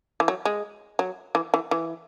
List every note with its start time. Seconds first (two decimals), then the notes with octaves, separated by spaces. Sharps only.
0.20 E3
0.28 F#3
0.45 G#3
0.99 F#3
1.35 E3
1.54 E3
1.71 E3